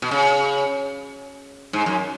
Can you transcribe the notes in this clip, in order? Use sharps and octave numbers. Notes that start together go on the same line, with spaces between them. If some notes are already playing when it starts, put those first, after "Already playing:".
B2
C#3
G#2
F#2